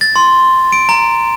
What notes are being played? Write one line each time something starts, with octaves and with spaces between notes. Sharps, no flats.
A6
C6
D7
A#5